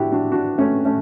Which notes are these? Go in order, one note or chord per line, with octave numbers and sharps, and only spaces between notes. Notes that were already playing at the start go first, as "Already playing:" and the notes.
Already playing: D4 E4 F#4 G4
D4 F#4
D4 F#4
A3 C#4
A3 C#4